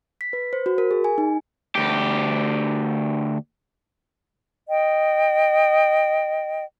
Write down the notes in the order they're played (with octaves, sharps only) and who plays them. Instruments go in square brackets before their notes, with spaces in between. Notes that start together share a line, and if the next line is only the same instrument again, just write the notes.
[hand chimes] B6
B4
C5
F#4
A#4
G#4
G#5
D#4
[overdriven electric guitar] D2 G4
[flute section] D#5 G5